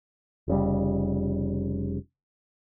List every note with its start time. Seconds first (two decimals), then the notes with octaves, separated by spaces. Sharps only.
0.48 F1 C#3 G3